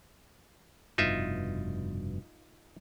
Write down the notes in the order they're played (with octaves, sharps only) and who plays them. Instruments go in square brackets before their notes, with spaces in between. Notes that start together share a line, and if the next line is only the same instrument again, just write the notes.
[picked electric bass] F1 G2 B2 [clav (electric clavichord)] D#4 F4 E5